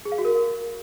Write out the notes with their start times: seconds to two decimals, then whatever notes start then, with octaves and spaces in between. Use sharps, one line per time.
0.05 G#4
0.12 F5
0.18 F#4
0.25 A#4